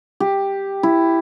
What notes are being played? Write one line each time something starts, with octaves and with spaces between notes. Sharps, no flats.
G4
E4